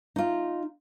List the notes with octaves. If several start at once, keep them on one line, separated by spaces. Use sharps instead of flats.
D#4 F4